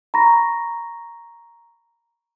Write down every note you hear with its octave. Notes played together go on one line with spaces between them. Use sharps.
A#5 B5 C#6 A#6